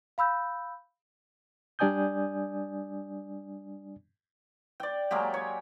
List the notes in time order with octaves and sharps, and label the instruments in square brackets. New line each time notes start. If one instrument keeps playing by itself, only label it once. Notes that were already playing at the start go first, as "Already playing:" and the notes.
[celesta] F5 B5 E6 G6
[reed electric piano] G3 D4 D5 G#5 D#6 G6
[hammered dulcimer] D5 G5
F#3 G#3 A#3 G4
C#5